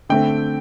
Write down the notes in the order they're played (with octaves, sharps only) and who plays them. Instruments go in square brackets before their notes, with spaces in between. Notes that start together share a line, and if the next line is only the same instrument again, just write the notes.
[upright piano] D3 A3 C4 [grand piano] G5